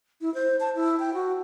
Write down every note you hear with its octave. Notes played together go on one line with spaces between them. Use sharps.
E4
C5
A5
E4
G5
F#4